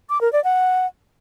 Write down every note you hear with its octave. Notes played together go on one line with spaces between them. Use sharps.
D6
A#4
D5
F#5